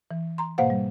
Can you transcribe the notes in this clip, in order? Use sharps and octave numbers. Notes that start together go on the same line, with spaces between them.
E3
A#5 C6
G#2 B2 A#3 C5 F5 F#5
G3